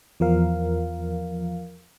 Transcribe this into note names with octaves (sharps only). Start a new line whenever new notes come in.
E2 F3 A#4 F5